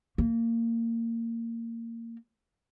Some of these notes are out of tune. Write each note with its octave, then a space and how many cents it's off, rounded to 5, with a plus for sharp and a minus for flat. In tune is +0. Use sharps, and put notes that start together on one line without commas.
A#3 -20